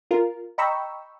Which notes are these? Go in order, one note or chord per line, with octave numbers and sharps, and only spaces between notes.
F4 A#4
D#5 G5 A#5 B5 C#6 E6